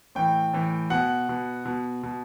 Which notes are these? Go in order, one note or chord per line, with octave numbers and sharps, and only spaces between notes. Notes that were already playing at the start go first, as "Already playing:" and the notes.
A2 E3 G5
A2 E3
B2 F#5
B2
B2
B2